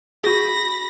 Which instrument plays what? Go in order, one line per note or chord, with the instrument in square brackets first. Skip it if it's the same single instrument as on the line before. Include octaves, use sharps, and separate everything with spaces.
[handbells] F#4 G#4 [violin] B5 A#6